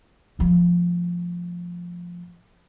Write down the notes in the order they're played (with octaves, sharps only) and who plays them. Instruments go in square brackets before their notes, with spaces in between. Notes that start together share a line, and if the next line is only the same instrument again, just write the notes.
[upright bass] A2 F3